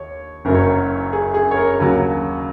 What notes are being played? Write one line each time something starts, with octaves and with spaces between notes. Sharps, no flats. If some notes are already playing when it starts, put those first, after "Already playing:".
Already playing: D#2 C#5
F#1 F#2 C#3 F#3 A#4
C#5
A#4
G#4
G#4
C#5
A#4
D#2 C#3 F#3